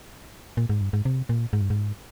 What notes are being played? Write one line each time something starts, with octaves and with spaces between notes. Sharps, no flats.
A#2
G#2
G2
G#2
C3
A#2
G#2
G2
G#2